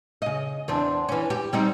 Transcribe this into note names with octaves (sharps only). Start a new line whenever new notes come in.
C#3 D#5
E2 C4 D4
E3 C#4
G4
G3 C4 D#4